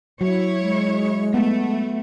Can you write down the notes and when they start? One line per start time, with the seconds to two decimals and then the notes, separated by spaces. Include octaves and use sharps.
0.21 F#3 E4 C#5
0.62 G#3
1.34 A3 B3